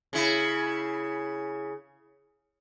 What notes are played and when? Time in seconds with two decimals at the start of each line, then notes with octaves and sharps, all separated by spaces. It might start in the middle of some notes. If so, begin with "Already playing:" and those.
0.13 C#3 E4